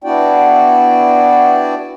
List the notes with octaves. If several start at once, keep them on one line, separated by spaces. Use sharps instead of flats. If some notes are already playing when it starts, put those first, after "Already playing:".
B3 D4 E4 F#4 D5 G5